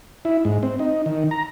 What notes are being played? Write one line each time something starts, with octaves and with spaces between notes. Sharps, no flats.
E4
G#2
C4
D#4
D#3
A#5